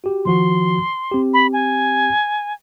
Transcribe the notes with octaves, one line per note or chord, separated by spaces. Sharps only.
F#4 G4
D#3 F3 F#4 C6
C4 G4
B5
G#5